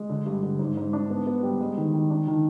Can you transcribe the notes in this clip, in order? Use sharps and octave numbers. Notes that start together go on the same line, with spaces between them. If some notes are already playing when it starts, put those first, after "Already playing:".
Already playing: G#3
D3
G2
D3
G#2
G#2
D4
B3
B3
G3
G#3
D#3
D#3
D4
D#3